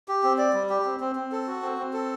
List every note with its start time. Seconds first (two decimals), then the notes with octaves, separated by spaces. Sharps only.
0.08 G4
0.23 C4
0.38 D5
0.54 G3
0.70 G4
0.85 C4
1.00 C4
1.16 C4
1.32 A4
1.47 F#4
1.62 C4
1.78 C4
1.93 A4